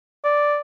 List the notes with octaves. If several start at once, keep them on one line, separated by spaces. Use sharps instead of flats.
D5